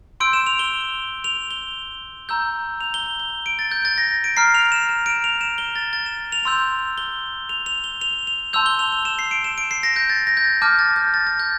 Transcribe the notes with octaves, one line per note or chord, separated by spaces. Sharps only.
C6 E6 G6 D7
E7
F7
G7
F7
G7
A#5 E6 G6
F7
G7
G7
D7
A6
G6
A6
A#6
D7
A#5 F6 C7
F7
E7
E7
D7
F7
E7
G7
A6
A6
E7
F7
C6 E6 G6 F7
G7
F7
F7
G7
F7
F7
A5 C6 E6 G6 F7
G7
F7
F7
E7
C7
D7
E7
D7
C7
A#6
G6
A6
A#6
G6
A6
A5 D6 F6 G6
A6
G6
A6
A6
G6